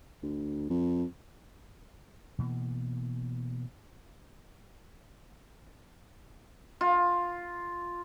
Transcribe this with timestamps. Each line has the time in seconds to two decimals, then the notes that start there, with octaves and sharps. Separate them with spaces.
0.23 D2
0.70 F2
2.39 B2 E3 A#3
6.81 F4